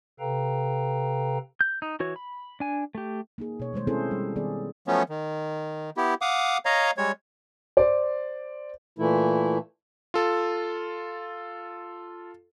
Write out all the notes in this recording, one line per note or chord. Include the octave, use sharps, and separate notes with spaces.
C3 A4 B4 F5 G5 A#5
G6
D#4
E3 F#4 C#5
B5
D4 G#5
A3 G4
A#3 D#4 G#4
B2 C#5
D#3 G3 G#3 C5
C4 C#4 E4 G#4 A4 C5
G3
D#3 G3 B3 G#4 D5
F3 F#3 A3 B3 C#4
D#3
B3 E4 G4
F5 F#5 D6 D#6
C#5 D#5 F5 A#5
G3 G#3 C#5
C5 D5
A#2 E3 A3 E4
F4 A4